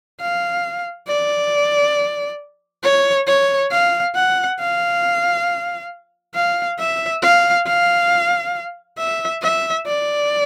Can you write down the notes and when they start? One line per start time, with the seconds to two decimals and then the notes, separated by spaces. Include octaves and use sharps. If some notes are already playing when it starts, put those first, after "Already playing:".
0.21 F5
1.07 D5
2.83 C#5
3.27 C#5
3.72 F5
4.16 F#5
4.59 F5
6.35 F5
6.79 E5
7.22 F5
7.67 F5
8.98 E5
9.42 E5
9.86 D5